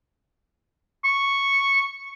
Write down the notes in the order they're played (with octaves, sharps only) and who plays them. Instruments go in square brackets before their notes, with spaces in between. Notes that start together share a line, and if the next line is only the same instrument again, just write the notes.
[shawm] C#6